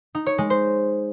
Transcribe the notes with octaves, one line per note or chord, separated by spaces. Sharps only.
D#4
C#5
G#3
C5